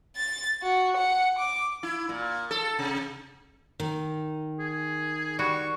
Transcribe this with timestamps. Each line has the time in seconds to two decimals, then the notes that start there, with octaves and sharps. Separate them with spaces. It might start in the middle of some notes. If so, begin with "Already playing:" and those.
0.16 A6
0.63 F#4
0.97 F#5
1.38 D6
1.83 E4
2.09 A#2
2.51 A4
2.79 C3
3.80 D#3
4.59 G#4
5.39 G3 F#4 C#6